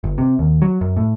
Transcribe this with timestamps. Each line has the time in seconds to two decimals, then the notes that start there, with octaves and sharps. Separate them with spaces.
0.04 G1
0.18 C3
0.39 D#2
0.62 F#3
0.81 F#2
0.97 A2